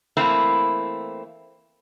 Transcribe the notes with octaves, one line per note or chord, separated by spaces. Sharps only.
E3 A3 A#3 C4 E4